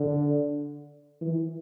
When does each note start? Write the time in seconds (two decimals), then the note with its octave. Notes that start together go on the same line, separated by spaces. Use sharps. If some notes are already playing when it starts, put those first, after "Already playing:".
Already playing: D3
1.21 E3